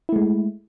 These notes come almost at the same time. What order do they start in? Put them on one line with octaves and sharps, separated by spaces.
E4 A3 G#3